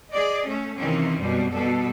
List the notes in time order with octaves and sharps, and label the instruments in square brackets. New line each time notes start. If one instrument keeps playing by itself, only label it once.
[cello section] G#4 D5 D#5
A3 C#4
C3 D#3 E3 A#3 C4 C#4
F#2 B2 G3
B2 G3 A4